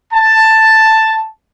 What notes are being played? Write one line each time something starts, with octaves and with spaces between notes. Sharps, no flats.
A5